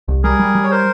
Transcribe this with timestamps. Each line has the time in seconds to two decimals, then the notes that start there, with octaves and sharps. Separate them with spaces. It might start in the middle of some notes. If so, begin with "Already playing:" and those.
0.08 C2
0.24 G3 G#4 A#4
0.39 G3
0.55 G3
0.63 C#5
0.71 A#4 C5